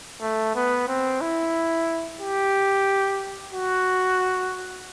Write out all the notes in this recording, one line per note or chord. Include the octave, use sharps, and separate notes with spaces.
A3
B3
C4
E4
G4
F#4